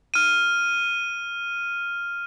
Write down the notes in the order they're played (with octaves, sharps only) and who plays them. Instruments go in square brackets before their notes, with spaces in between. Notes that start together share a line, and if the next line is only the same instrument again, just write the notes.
[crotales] F6 D#7